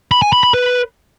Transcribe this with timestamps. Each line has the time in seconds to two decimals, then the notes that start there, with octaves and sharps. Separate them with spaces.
0.11 B5
0.22 G#5
0.33 B5
0.43 B5
0.54 B4